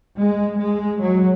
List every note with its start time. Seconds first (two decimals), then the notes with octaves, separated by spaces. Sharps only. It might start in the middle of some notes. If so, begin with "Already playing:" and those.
0.15 G#3
0.59 G#3
1.01 F#3